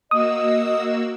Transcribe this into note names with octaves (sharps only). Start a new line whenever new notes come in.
A#3 F#4 D#5 D#6 E6